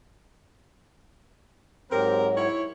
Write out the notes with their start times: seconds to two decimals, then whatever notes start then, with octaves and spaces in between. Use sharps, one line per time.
1.91 G#2 F#3 C4 G4 A#4
2.37 E4 C#5